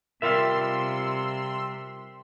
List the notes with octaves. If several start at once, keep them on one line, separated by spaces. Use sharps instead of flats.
C3 G3 F4 A#4 E5 C6 E6 F6